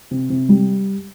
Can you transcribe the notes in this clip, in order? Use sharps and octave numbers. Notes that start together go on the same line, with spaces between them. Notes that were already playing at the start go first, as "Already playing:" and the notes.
C3
C3
G3